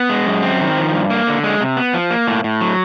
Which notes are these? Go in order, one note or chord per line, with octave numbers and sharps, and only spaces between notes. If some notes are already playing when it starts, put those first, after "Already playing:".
Already playing: B3
G#3
F#2
C4
D#3
F3
G2
A#3
D3
G#3
C3
B3
F3
A#3
A2
A2
F#3